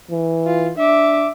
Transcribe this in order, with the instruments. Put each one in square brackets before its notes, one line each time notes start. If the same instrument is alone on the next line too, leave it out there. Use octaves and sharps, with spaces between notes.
[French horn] E3
[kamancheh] F4
[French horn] D4 [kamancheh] E5 D6